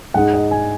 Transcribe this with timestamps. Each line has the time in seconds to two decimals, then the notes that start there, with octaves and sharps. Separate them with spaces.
0.14 G#2 G#3 D#4 F#5
0.34 D#5
0.51 G#5